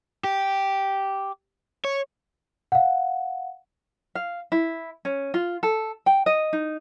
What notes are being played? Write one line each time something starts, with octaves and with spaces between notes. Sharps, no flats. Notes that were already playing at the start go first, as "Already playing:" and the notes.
G4
C#5
F5 F#5
F5
E4
C#4
F4
A4
G5
D#5
D#4